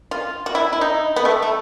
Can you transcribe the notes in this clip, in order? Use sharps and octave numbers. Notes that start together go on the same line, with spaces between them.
F4
F#4
E4
E4
D#4
B3
A3
A3